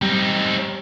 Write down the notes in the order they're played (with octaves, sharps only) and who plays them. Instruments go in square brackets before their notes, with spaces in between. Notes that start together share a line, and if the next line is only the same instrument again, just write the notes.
[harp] G3 [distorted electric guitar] C4 D#4